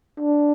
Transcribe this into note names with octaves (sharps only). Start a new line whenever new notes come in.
D4